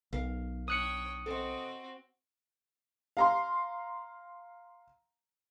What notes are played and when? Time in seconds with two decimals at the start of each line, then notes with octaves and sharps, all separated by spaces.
0.13 B1 A#4 F5
0.68 D4 C#5 G5 D#6 F#6 C#7
1.26 C4 F#4 A4 D#5
3.17 F5 A#5 C6